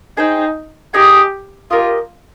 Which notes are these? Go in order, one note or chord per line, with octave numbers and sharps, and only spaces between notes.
D#4 G#4 C5 G5
D#4 G4 G#4 D#5 G#5
F4 G4 A#4 D#5